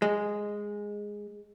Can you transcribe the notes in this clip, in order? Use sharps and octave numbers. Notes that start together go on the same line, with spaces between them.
G#3